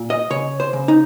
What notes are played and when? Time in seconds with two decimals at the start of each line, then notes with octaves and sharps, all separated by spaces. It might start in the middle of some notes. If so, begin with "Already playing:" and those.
Already playing: A#2
0.10 D#5
0.30 C#3 C#5
0.60 C5
0.73 C#3
0.88 D#4